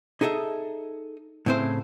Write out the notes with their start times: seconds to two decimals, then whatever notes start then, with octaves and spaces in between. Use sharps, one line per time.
0.21 D#4 G#4 A4 D#5 E5
1.46 A2 C#3 C4 E4 C5